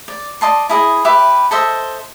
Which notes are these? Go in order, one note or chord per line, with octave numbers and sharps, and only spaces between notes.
D5
D5 D#5 A5 C6
E4 G#4 D#5
G4 B4 E5 D6
A4 C5 D#5 E5